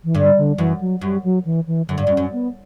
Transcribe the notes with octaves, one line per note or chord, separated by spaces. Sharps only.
E3
G2 D3
D3
F#2 E3
F#3
F#2 G3
F#3
E3
E3
F#2 D3
G2
F#2
C#4
F#2
B3